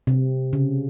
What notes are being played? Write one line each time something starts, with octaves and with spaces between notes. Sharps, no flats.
C3
C#3